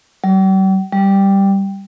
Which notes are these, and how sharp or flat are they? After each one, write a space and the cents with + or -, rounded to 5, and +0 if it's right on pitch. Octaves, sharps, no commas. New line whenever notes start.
G3 -45
G3 +0